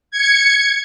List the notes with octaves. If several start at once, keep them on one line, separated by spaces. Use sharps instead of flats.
G#6 C#7